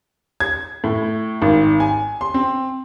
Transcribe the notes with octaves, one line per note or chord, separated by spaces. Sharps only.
G#6
A2
G#1
G#5
C6
C4